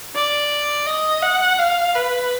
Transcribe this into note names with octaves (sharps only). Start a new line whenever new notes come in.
D5
D#5
F#5
F5
B4